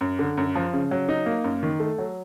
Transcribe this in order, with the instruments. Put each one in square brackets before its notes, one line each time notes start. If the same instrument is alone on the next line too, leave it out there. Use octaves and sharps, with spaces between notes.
[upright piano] F#2
D3
F#2
F3
C#3
F#3
D#4
A#3
F#2
D#3
A3
F#3